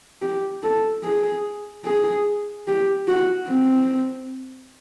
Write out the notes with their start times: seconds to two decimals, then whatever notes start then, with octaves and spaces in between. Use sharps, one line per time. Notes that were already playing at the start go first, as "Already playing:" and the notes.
0.22 G4
0.63 A4
1.04 G#4
1.85 G#4
2.68 G4
3.08 F#4
3.49 C4